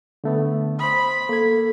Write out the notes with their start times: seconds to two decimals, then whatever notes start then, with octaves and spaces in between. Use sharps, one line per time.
0.24 D3 A3 B3
0.79 C5 B5 C6 D#6
1.29 A#3 A4 G#6